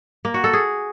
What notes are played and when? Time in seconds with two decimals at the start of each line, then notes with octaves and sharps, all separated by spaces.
0.25 A#3
0.34 F#4
0.44 A4
0.53 G#4